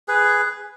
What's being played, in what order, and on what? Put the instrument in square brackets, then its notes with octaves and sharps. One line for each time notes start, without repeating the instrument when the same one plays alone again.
[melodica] G#4 B4